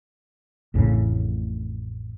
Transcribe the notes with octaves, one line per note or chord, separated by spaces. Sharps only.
A1 F2 A2 C#3